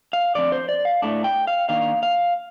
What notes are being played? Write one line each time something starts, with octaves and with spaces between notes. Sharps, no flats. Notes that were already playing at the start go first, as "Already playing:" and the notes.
F5
D3 F3 A3 C4 D5
C5
D5
F5
A2 A3 D4
G5
F5
D#3 A#3 D4 F5
F5